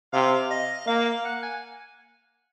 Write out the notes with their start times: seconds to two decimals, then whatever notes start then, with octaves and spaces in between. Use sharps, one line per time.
0.13 C3 F5
0.50 D#5
0.87 A#3 F5
1.06 F5
1.25 F#5
1.43 G#5